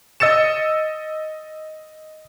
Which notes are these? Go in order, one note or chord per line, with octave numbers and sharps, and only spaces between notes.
D#5 E6 A6 C#7 E7